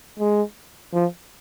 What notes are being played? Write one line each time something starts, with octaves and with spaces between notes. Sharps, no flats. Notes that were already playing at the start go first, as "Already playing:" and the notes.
G#3
F3